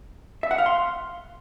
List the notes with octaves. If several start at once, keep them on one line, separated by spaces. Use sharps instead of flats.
E5
F#5
F5
C6